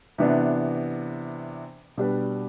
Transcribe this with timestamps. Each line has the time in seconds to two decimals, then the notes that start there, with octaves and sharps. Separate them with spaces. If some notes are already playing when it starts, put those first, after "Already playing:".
0.18 C3 E3 B3 D4
1.97 B2 G3 D4 G4 B4